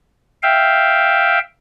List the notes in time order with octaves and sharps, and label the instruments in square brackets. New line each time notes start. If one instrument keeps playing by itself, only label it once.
[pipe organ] E5 F5 G5